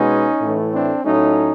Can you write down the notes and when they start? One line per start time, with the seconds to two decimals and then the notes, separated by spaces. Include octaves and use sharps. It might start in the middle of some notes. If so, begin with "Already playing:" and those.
Already playing: B2 G#3 B3 C#4 D#4
0.40 A2 E3 A3
0.73 C4 D4
1.04 A2 F#3 A3 C#4 D#4